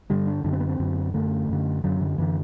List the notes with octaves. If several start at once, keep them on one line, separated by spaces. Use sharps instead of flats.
G2 D3 G3
D4
F#2 D3 D4
C4
B3
C4
F#2 D3
F#2 D3 A3
F#2 D3
F#2 D3 F#3
D3
F#2 D3 E3